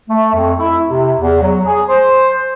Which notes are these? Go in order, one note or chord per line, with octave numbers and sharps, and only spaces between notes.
A3
F2
E4
C3
E2
F#3
G#4
C5